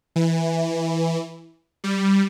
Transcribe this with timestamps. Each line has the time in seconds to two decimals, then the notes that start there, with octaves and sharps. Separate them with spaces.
0.16 E3
1.84 G3